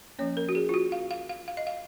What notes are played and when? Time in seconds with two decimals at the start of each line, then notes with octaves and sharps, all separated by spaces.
0.18 F3 A#3 C#4 C#5
0.37 A#4
0.49 F#4
0.55 G#4
0.69 F4
0.74 F#4
0.92 F5
1.11 F5
1.29 F5
1.48 F5
1.57 D#5
1.67 F5